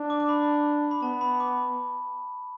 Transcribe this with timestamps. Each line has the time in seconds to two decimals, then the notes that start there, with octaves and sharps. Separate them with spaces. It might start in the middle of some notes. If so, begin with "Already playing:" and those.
Already playing: D4
0.10 D6
0.20 D6
0.29 B5
0.91 B5
1.03 B3 A5
1.21 B5
1.40 D6